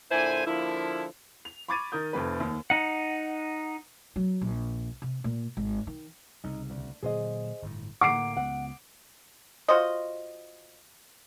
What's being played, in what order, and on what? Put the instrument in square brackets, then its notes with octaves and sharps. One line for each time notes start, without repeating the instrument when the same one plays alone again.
[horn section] A#2 D3 E4 C5 G#5
D3 F3 A#3 E4
[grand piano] F7
B5 C#6 D6 G#6 A6 D#7
D#3 A#4 D#6 G6
F1 F2 B4
D#2
[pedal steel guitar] D#4 F#5
[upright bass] F#3
A#1
C3
A#2
G#1
D#3
[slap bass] C2 C#3 [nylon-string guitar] D#4
[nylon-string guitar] D2
[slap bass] A#2 D3 F#3 [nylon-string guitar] G#4 C5 D#5
[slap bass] G1 A2
[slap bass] A2 D3 [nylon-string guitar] A#3 F#5 [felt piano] D6 C7 D7
[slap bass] C#2 B3 [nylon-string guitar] F#5
[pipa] F4 F#4 C5 D#5